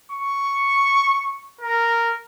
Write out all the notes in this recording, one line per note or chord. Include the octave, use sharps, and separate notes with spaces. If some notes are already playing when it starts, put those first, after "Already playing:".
C#6
A#4